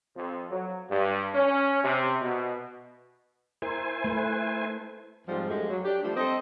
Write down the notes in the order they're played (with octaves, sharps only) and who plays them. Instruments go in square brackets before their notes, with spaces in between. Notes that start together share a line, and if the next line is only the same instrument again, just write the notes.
[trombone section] F2
F#3
G2
C#4
C3
B2
[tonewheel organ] E4 C5 G#5 [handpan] A#4
[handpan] A3 B4
[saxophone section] F2 G#2 F3 G3
F#2 G#3 A3 G4
F#3
D4 G4
F3 G3 A3
C4 A4 D#5